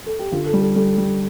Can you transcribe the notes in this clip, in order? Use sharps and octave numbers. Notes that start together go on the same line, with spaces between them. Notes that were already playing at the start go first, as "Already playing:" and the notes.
A4
G4
D3 F4
A4
G3
A4
G3 A4
G3